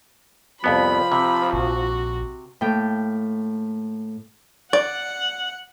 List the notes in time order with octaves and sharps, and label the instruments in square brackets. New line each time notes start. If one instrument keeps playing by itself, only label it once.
[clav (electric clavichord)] C2 F2 B3 [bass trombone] F3 [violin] B5
[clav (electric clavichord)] C3
[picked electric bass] A#1 [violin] F#4
[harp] A2 A#3 G5
[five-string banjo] D5 [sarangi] F#5